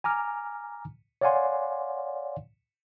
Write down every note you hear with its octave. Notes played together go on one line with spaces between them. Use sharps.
G#5 A#5 D6 F6
C#5 D5 F5 F#5 G#5 C6